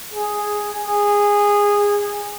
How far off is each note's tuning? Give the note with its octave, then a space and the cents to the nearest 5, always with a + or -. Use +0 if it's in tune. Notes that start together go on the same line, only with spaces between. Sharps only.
G#4 +0
G#4 -15